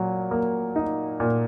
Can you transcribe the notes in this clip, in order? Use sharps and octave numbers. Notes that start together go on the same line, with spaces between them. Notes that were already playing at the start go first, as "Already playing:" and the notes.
Already playing: A#2 F#3
A#3
D#4
A#2